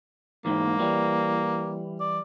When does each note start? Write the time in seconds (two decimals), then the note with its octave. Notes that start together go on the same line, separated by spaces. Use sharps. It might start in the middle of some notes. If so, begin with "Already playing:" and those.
0.45 E2 G#2 D#3 A#3
0.80 E3 G3
2.00 D5